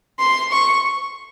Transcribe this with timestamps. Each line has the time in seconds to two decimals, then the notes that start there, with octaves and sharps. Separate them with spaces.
0.19 C6
0.52 C#6